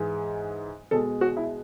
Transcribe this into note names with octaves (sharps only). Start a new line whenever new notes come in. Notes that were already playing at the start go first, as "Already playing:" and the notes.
Already playing: G#2 E3 G#3
B2 G#3 A4
F#4
E4